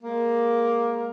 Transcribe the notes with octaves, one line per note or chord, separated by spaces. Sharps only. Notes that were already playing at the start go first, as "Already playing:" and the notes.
G#3 A#3